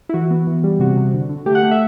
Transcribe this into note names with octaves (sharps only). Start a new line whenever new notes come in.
E4
E3 F#4
B3
E3
G3
C3 F#4
C3
D3
D3
A3 G4
F#5
A3
E5